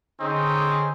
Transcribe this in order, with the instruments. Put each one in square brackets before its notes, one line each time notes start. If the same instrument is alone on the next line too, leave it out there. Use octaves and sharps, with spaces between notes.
[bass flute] D3 [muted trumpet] C4 [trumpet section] C#4 D#4 G#4